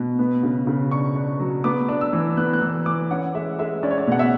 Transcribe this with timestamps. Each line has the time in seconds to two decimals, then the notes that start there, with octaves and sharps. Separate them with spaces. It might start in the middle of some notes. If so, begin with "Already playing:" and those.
Already playing: B2
0.19 B3
0.43 C#3
0.67 C#3
0.91 D4 C#6
1.16 D4
1.40 F#3
1.64 B3 D6
1.89 D4
2.01 E6
2.13 E3
2.37 B3 F#6
2.53 F#6
2.61 E3 E6
2.86 E3 D6
3.10 C#4 F#5
3.34 G#3 E5
3.59 G#3 E5
3.83 C#4 D5
3.90 C#5
3.98 D5
4.07 B2 F#5
4.19 E5